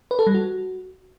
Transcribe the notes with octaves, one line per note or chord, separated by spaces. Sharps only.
B4
A4
G3
F#4